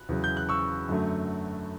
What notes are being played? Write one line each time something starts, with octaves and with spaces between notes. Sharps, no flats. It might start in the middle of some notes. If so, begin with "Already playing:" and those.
Already playing: F#6
E2 C#3 F#3
G6
F#6
C#6 E6
F#2 D3 F#3 A3